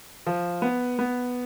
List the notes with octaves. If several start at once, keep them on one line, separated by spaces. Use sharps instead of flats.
F3
B3
B3